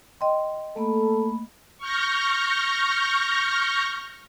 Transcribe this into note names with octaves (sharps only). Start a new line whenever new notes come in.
D#5 G5 C6
A3 A#3 A4 B5
C#6 F6 G6 A#6